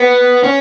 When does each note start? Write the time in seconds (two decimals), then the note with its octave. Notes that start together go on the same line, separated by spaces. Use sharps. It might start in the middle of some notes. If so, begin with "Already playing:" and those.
Already playing: B3
0.44 C#4